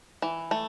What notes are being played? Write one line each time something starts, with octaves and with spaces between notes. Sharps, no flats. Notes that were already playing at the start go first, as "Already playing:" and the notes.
E3
A3